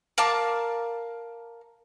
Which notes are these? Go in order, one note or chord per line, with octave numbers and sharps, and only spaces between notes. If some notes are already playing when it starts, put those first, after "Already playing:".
A#4 F5 A5 D6